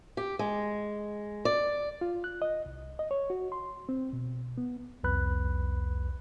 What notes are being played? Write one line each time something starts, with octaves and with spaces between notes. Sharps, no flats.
G4
G#3
D5
F4
F#6
D#5
C2
D#5
C#5
F#4
C6
C4
B2
B3
C2 F2 B4 B5 F#6